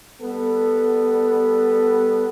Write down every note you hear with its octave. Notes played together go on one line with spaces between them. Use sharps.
G3 B3 A4